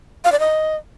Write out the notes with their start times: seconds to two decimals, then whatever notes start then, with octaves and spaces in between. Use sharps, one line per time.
0.25 F5
0.32 D5
0.40 D#5